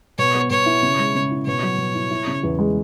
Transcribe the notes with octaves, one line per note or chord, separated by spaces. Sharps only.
B2 C#5
B3
B2 C#5
E4
C#3
G#3
C#3
E4
B2 C#5
F#3
B2
E4
E4
C#3
E2
G#3